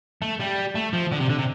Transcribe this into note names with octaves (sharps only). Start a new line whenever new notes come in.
A3
G3
A3
F3
D3
C3
D3
C3